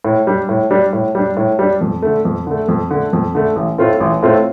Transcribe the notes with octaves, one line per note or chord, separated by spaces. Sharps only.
A2
G3 D4
A2
G3 D4
A2
G3 D4
A2
G3 D4
F2
D3 A3
F2
D3 A3
F2
D3 A3
F2
D3 A3
A1
A2 A3 C4 F4
A1
A2 A3 C4 F4